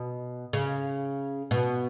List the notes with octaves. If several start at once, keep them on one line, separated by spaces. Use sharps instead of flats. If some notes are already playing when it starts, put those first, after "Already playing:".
Already playing: B2
C#3
B2